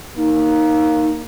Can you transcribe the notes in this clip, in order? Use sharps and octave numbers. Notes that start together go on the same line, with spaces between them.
A#3 D#4